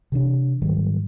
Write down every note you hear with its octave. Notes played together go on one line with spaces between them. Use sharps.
C3 E3 D4
G#2 D#3 F#3 G3